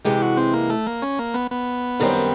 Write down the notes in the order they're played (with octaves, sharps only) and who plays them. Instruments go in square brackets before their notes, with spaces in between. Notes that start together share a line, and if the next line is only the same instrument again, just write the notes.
[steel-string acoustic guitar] C3 E3 G#3 [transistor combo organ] G4
[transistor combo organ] F#4
C4
A#3
A3
A#3
C#4
A#3
B3
B3
[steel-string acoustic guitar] F#2 D#3 G3 C4